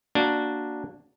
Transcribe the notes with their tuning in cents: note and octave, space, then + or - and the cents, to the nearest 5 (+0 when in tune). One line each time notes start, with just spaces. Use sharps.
A#3 +0 D4 +0 F#4 +0